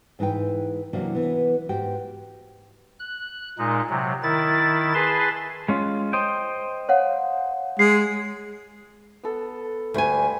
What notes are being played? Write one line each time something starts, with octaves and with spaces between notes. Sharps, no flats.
G#2 E3 D#4 B4 G5
C3 E3 F#3 A#3 D4
E3 B3
G#2 F#4 G4 G5
F#6
A#2 G#3 D#4
C3 F#3
D#3 E4 A6
G#4 B4 A5 C6
G#3 C#4 F4
C5 D#5 G5
C#5 F5 F#5
G#3 C7
B3 A4
D2 G3 B4 C5 G#5